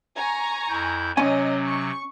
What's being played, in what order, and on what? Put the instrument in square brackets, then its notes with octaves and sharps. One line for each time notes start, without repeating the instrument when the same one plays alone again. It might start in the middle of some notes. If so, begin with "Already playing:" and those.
[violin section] G#5 A#5 C#6
[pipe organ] F2 E4 G6
[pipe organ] C3 F#3 [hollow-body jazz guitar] C#4 G#5 [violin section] C#5 D#5
[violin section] C#6